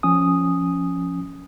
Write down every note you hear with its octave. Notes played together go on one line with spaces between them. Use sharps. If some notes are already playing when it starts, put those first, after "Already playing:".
F3 C#4 G#5 D#6